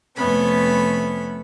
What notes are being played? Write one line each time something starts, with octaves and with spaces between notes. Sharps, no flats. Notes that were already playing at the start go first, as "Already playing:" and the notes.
F2 C3 A3 B3 C#4 B5